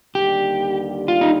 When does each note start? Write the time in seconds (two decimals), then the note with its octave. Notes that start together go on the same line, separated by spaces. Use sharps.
0.15 D#2 D3 G3 G4
1.08 F4
1.21 D#4